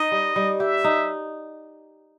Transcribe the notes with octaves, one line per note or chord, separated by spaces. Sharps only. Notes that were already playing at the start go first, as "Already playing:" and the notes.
Already playing: D#4 D#5
G3
G3
G4 E5
D#4